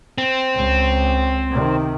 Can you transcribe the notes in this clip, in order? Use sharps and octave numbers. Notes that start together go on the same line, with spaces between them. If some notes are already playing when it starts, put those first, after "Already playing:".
C4
C#2
C3 D#3